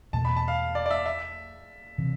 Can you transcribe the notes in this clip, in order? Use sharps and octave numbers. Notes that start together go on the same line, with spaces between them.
E2 B2 A3 A5
B5
A5
F5
D5
D5
E5
E5
C3 E3